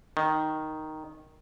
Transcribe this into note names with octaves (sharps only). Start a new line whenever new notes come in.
D#3